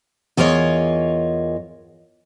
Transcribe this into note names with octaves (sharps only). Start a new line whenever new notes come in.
E2 F4 A#4 C#5 D#5